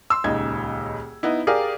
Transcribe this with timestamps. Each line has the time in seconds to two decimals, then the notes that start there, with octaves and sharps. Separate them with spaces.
0.10 C6 E6
0.24 D#1 C#2 D#4 G#6
1.23 B3 D#4 E4
1.47 G4 G#4 A#4 D5 F5